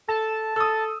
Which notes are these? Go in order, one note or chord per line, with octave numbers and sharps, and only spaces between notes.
A4 A5
A4 D#6 E6